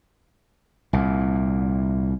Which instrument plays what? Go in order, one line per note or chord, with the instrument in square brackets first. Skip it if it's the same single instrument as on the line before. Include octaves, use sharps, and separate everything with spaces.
[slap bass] C2 A#2